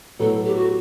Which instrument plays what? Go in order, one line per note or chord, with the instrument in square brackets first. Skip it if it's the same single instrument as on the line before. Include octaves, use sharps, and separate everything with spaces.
[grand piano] A2 F#3 B3 [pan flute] A4
[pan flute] G4
F#4